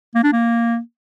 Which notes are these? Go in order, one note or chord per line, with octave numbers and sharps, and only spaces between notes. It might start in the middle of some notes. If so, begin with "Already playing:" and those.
A#3
D4
A#3